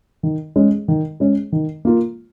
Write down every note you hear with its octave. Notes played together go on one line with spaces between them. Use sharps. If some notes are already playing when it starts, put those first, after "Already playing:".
D#3
G#3 C#4
D#3
G#3 C#4
D#3
A#3 F4